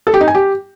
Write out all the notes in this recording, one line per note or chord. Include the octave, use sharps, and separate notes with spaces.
A4
G4
D#4
G#5
G4